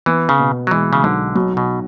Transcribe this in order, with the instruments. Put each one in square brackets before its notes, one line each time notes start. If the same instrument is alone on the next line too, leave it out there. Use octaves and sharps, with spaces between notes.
[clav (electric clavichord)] E3 [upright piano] B3
[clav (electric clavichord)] C#3
[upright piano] B2
[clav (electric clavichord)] F#3
[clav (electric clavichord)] E3 [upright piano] G#3
[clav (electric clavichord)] C#3
[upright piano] B1 [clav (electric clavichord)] D3
[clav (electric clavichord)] B2 [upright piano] F#3
[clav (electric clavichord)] B2